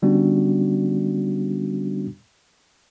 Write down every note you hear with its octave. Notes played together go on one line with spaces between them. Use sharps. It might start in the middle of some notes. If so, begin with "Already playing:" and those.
D3 G3 B3 C#4 D4 F#4